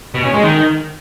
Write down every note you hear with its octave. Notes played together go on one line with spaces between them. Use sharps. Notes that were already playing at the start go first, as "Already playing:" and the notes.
B2
C#4
G#3
D#3